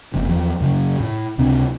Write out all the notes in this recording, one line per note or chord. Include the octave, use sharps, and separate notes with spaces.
F#1 F2 C#3
E2 F3
F#2 C#3
A2
C#2 C3 C4 D4